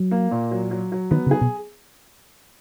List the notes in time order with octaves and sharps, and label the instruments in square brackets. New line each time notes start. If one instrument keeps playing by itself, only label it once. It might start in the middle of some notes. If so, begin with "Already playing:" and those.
Already playing: [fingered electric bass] F#3
[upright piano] A#3
A#2
F#3
F#3
F#3
[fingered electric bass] D#3 [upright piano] B3
[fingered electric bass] C#3
[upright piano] G#4
[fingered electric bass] B2